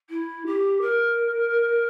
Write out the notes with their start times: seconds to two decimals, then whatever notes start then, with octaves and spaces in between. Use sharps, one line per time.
0.10 E4
0.46 G4
0.81 A#4